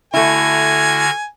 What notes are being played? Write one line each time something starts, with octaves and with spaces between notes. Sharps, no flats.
D3 A3 E4 F#4 G#5 F6